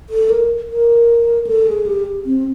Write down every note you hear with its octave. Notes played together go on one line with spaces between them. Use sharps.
A4
A#4
A#4
A4
G#4
G4
C4